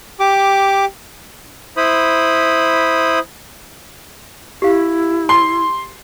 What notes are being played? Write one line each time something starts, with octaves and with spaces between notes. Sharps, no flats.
G4 D6
E4 C5 B5 D#6
E4 G4 F5
C6